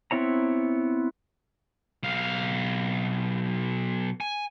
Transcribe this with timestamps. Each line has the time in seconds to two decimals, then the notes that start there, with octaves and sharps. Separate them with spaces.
0.11 B3 C4 E4 C#5 A#5
2.03 B1 F5
4.21 G#5